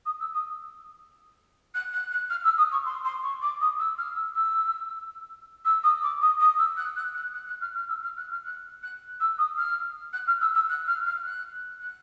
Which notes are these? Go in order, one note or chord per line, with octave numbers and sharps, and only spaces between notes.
D#6
E6
D#6
F#6
F#6
F#6
F6
E6
D#6
C#6
C6
C6
C#6
D6
D#6
E6
F6
E6
E6
E6
D#6
D6
D#6
D#6
E6
F#6
F#6
F#6
F#6
F#6
F6
F6
E6
F6
F#6
F6
F#6
F#6
E6
D#6
F6
F#6
F6
E6
E6
F#6
F6
F6
F#6
F#6